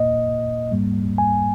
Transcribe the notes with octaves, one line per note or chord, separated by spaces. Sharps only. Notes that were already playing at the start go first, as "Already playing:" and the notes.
Already playing: A#2 A#3 D#5
G#2 G3 A#3
G#5